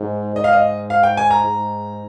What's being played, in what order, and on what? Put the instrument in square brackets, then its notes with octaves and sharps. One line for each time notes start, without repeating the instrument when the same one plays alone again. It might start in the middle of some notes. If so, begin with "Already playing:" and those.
Already playing: [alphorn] G#2
[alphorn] G#2 [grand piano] D#5
[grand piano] F5
D#5
F5
G5
G#5
A#5
[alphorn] G#2